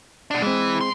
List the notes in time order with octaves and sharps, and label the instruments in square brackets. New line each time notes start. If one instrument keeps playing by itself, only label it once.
[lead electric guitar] B2 D4
[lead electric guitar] E3 [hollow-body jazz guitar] G#3 C4
[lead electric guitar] G#2 C6